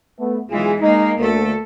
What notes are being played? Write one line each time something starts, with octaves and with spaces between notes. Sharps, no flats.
A3 B3
B1 E3 G#3 F4 G#4
G#3 A#3 D#4
D2 A3 A#3 A4